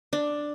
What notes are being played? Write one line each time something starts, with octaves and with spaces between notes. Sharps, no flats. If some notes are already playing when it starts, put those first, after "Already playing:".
D4